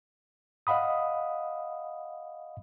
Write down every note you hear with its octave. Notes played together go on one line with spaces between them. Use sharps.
D#5 F5 F#5 B5 D#6